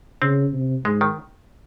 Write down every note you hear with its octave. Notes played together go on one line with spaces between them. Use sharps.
C#3 C4
C3
G#2 G#3
D#3